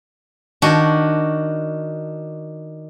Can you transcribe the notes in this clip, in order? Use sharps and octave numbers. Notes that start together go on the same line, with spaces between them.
D#3 D4 F#4